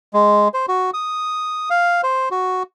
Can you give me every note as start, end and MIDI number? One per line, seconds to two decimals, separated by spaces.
0.13 0.48 56
0.54 0.66 72
0.68 0.90 66
0.94 1.69 87
1.70 2.01 77
2.03 2.29 72
2.31 2.63 66